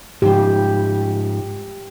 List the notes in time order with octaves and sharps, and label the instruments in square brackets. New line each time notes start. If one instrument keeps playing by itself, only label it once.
[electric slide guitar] G#2 F3 [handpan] G4